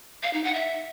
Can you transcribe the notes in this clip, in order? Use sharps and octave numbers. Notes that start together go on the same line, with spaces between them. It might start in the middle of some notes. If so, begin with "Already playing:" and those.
F5
D#4
F#5
E5